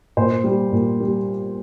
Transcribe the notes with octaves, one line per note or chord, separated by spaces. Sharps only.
A#2 C5
G3
A#2
G3